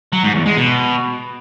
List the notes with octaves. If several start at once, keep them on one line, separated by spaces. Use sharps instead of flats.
F#3
G#2
E2
G#3
B2